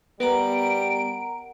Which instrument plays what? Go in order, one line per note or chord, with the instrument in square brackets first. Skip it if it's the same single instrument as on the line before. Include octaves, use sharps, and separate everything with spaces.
[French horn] G3 [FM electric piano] B3 [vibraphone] A#4 F#5 A#5 [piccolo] D7